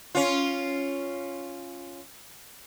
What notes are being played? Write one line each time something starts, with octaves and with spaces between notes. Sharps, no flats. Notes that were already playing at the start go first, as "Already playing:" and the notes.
C#4 F4